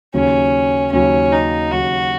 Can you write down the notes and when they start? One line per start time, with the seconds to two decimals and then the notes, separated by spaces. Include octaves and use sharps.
0.14 D#2 C#3 F#3 C#4
0.92 D#2 C#3 F#3 C#4
1.32 D#4
1.72 D#2 C#3 F#3 F#4